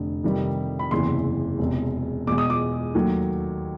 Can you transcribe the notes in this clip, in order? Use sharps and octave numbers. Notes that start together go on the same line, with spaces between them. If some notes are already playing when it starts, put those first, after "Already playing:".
Already playing: F1 D3
F2 C3 D#3 G3
B5
F#1 E2 C3 E3 C6
E1 E2 C3
E2 B2 G#3 D6
D#6
D6
D#2 D#3 F#3 A3